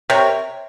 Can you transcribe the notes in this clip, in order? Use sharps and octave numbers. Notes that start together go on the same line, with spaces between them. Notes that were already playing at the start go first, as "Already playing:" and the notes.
C3 A#4 C#5